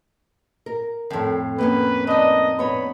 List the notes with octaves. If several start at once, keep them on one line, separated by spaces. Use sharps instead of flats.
A#4
F2 A2
A#3 B3 C#4 B4
D4 D#4 D#5
B3 C#5 B5